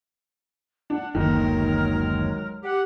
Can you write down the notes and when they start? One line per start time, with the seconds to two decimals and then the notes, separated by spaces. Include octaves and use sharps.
0.90 D4 F#5
1.15 F#1 D2 D#3 F#3 G#3 A#3 A#4
2.63 G4 F#5